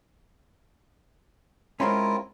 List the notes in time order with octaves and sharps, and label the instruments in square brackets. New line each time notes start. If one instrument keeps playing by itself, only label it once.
[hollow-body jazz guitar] G#3 C4 C#4 [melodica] E4 F4 A#4